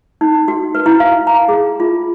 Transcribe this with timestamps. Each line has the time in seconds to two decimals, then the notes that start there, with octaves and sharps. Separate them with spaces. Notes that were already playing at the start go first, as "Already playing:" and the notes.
0.21 D#4
0.48 F#4
0.75 B4
0.86 E4
1.00 F5
1.27 A#5
1.48 G#4
1.80 F4